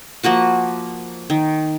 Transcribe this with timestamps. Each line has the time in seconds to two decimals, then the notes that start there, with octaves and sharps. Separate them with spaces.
0.23 F3 A#3 F#4 F#5
1.30 D#3